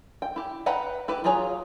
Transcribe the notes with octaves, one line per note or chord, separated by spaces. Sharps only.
G5
E4 G4
B4 F#5 G5 A#5 B5
E4 G4 B4
F#3 F4 G#4 C#5 A#5